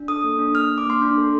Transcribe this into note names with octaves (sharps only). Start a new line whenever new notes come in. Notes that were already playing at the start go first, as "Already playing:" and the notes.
Already playing: D4
A4 D#6
A#3
D4
A#3 F6
D4
D6
A#3 C6
D4
A4